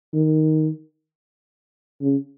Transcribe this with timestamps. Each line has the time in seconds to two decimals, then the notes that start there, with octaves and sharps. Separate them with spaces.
0.14 D#3
2.01 C#3